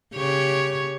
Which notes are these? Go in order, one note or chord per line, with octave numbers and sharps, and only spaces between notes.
C#3 G4 C#5